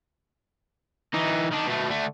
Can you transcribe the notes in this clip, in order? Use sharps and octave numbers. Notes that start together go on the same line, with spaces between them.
E3 D#4
D#3 D4
B2 A3
D3 A3